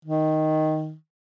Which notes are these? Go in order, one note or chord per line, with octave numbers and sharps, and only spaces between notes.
D#3